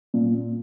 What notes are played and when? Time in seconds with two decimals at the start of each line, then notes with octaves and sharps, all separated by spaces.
0.14 A#2